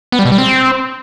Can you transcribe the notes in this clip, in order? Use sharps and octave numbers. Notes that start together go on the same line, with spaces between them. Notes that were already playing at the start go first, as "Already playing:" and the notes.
B3
G3
B2
G3
C4